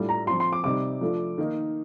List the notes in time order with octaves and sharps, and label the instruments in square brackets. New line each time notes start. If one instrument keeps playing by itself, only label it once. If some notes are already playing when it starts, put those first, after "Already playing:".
Already playing: [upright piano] A2 G3 D4 F4
[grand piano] A#5
[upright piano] F3 C4 F4 [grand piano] C6
[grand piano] C6
D6
[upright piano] C3 G3 C4 D#4 [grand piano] D6
[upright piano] F3 A3 D4 F4
D#3 A#3 D#4